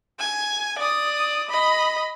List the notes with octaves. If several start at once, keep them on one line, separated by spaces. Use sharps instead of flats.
G#5
D5 D#6
D#5 B5